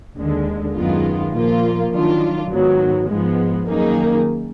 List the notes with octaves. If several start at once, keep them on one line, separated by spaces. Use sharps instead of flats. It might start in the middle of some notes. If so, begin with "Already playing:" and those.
D#2 D3 G#3
F#2 D#3 G#3 B3 F4
A#2 F3 A#3 F4
D#3 F#3 D4 F4
G#2 D#3 F#3 B3
G#2 F3 G#3 B3
F#2 D#3 A#3 D#4 G#4